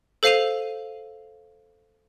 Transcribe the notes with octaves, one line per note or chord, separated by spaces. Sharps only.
A4 C5 F5 C7 D#7 F7